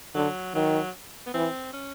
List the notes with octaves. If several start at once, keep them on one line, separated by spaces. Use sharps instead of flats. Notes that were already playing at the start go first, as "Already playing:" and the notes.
D3 F#3
D#3 F#3
B3
E3 C4
C#4